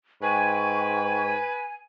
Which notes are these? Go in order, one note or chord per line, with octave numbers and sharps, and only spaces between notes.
G#2 B4 G5 G#5 C#6